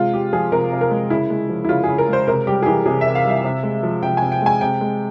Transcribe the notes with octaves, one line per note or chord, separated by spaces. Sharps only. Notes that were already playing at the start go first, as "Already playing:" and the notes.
Already playing: C3 G#3 F4
G#3 G4
F3 G#4
C3 A#4
C3
A#4
G#3
C#3 E4
G#3
F3
E4
C#3 F4
C#3 G#4
A#4
G#3 C5
C3 A#4
G3 G4
G#4
E3 G4
C3 G#4
C3 E5
F5
G3 E5
C3
G#3
F3
C3 G5
C3 G#5
G5
G#3 G#5
C3 G5
G#3